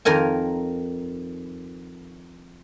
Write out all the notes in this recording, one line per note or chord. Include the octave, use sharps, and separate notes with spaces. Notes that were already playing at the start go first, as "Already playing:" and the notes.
F2 D#3 A#4 G#5